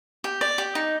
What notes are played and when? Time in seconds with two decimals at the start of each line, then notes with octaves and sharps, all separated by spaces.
0.24 G4
0.41 D5
0.58 G4
0.75 D#4